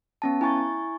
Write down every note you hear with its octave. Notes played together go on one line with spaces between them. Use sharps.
B3 C#4 A5
E4 G#5 C#6 A6